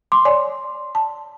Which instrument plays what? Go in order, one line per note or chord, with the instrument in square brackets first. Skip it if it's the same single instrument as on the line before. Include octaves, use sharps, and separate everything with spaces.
[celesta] C6 [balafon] D6
[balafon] C#5 D5 G#5
A5